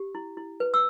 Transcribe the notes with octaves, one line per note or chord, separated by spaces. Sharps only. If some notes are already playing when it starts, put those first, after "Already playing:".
Already playing: G4
E4
E4
B4
E6